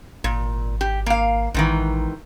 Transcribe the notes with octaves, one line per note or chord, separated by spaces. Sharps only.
G#1 A#2
G4
A#3 F5
A1 G#2 D#3 E3